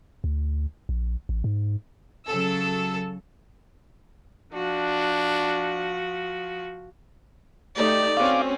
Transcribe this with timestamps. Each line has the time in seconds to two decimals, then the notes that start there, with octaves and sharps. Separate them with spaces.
0.24 D2
0.89 A#1
1.29 A1
1.44 G#2
2.28 C#3 F#3 A4 E6
4.53 F3 D4 F#4
7.76 A3 D#4 G4 D5
8.17 C4 C#4 F#4 F5 D6